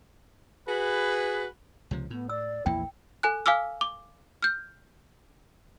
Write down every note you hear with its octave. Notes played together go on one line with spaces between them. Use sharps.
F#4 G#4 B4
C#2 C3 F3
A2 B3
D5 E6
A#1 E2 A#3 E4 G5
A4 G#5 F#6
F5 G#5 D6 E6 F6
D6
F6 G6